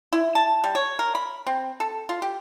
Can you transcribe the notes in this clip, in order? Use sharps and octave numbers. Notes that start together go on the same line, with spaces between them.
E4
A5
G3
C#5
A#4
B5
C4
A4
F4
G4